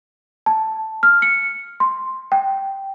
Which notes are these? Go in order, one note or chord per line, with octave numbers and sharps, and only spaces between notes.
A5
F6
C#7
C6
G5